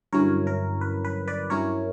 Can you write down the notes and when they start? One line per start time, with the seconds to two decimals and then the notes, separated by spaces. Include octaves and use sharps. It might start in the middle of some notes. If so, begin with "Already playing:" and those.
0.13 G2 D3 F#3 C#4 E4 A#4 C#5
0.47 A#4
0.81 B4
1.05 B4
1.28 B4 D5
1.50 G2 F#3 C#4 E4 A#4 C#5